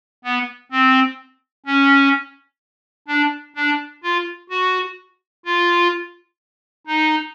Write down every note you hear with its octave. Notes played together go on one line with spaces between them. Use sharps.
B3
C4
C#4
D4
D4
F4
F#4
F4
D#4